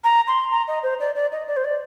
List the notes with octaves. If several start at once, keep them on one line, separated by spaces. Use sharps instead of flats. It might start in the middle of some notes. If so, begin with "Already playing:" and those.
A#5
C6
A#5
D#5
C5
D5
D5
D#5
D5
C5
D5